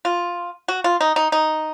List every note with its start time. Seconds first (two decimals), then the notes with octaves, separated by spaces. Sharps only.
0.05 F4
0.68 F#4
0.84 F4
1.01 D#4
1.16 D#4
1.32 D#4